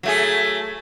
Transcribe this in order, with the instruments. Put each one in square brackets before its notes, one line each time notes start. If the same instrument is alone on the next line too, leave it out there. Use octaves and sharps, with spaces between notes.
[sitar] F#3 A3 G#4